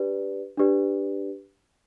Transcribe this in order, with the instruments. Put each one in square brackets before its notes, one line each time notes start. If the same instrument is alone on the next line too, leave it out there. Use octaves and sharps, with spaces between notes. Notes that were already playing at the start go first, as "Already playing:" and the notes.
Already playing: [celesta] D4 G4 B4 D5
D4 G4 B4 D5